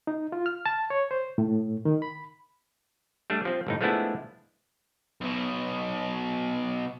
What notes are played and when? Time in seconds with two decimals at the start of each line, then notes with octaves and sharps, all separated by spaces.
0.07 D#4
0.32 F4
0.46 F6
0.66 A5
0.90 C#5
1.11 C5
1.38 A2
1.85 D#3
2.02 B5
3.30 G3 A3 D4
3.45 F3 C4
3.67 G1 A2 D#4
3.81 F3 G#3 A3 B3 D4 E4
5.21 B1 B2